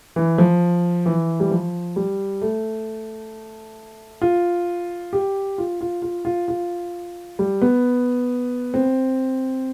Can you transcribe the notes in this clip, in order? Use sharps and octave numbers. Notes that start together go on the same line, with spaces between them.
E3
F3
E3
G3
F3
G3
A3
F4
G4
F4
F4
F4
F4
F4
G3
B3
C4